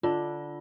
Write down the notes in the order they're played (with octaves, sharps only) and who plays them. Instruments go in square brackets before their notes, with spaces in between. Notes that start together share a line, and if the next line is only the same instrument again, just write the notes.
[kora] D3 D4 [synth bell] F4